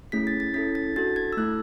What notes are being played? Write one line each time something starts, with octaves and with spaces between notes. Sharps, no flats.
A3 C#4 E4 G#4 B6
A6
A6
C#4 E4 A4 B6
A6
D4 F#4 A4 A6
G#6
E6
A3 E4 A4 F#6